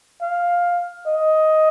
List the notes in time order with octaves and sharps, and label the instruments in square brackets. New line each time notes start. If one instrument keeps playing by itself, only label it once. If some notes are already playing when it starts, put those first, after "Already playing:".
[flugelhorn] F5
D#5